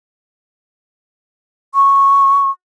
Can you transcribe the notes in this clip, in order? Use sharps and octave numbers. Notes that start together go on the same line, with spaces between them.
C#6